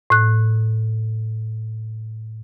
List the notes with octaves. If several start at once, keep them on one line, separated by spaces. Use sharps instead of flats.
A2 F#6